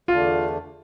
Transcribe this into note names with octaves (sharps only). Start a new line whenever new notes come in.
E2 D3 A3 D4 F4